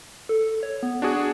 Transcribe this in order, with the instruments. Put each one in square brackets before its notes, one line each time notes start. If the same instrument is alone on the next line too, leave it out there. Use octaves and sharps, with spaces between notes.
[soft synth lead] A4
C#5
B3
[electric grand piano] D4 F#4 G#4